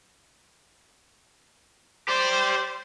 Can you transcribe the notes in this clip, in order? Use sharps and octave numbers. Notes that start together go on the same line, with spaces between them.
G4 C5 D5